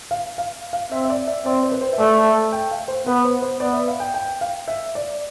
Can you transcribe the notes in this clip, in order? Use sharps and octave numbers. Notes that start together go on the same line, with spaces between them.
F5
F5
F5
C4 E5
E5
D5
E5
C4 D5
C5
B4
C5
E5
A3 D5
G5
F5
C5
B3 B4
C5
C5
B3 D5
E5
F5
G5
G5
F5
E5
D5